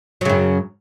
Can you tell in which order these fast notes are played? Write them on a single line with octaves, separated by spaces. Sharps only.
F#3 C#3 F#2